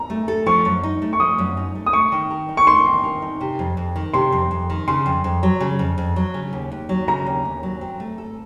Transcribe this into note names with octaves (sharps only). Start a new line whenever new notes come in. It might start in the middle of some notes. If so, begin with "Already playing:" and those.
Already playing: A#5
A3
A4
F3 C#6
F#2
D#4
A3
C#6
F3 D#6
F#2
D#4
A3
D#6
A3 C#6
D#3
A#4
D#4
C#6
A3 C6
D#3
A#4
D#4
C3
F2
F2
D#3
C3 C6
F2
F2
D#3
C#3 C6
F2
F2
F#3
C#3
F2
F2
F#3
C#3
D#2
D#2
F#3
C#3 A#5
D#2
D#2
F#3
C4
A3
A4